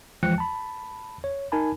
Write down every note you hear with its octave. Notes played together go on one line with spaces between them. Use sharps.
E3 F3 G#3 G5 F#6 C#7
A5 B5
C#5
D#4 A#4 G#5 A5 B5